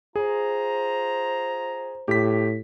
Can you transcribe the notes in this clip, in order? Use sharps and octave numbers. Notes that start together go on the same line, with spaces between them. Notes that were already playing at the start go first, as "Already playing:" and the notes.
F4 G#4 C5 A#5
A2 G4 B6